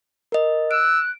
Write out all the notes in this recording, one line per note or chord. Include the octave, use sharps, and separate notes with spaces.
A#4 D#5
E6 F#6 D7